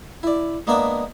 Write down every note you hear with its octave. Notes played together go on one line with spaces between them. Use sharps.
E4 D5
G#3 A#3 B3 D4 A#4 E5